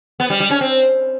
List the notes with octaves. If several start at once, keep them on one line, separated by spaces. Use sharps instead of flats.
B3
G3
G3
C#4
C4